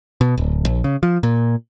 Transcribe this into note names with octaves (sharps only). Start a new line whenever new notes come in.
B2
D1
A#1
C#3
F3
A#2